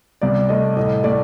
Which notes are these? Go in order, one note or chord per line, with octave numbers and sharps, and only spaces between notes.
C2 D5
A3 D#5
A2 D#5
A3 D5